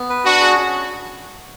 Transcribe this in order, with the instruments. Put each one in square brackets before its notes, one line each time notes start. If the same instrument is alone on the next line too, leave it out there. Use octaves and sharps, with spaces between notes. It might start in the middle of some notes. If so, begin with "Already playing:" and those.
Already playing: [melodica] B3
B4
[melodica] D4 [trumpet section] F#4
[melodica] G#4
C#4